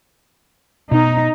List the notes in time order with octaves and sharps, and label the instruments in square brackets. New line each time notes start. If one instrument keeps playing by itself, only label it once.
[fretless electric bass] B2 [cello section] D#4